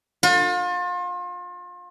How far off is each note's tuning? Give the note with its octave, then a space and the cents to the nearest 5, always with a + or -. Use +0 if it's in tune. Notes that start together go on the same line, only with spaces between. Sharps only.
F4 +35